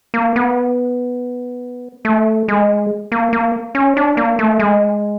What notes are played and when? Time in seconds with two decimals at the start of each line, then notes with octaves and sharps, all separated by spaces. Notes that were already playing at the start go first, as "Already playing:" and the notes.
0.14 A#3
0.36 B3
2.05 A3
2.48 G#3
3.12 A#3
3.33 A#3
3.75 C#4
3.97 D4
4.17 A#3
4.39 A3
4.60 G#3